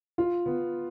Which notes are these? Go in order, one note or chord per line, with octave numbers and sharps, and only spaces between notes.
F4
B3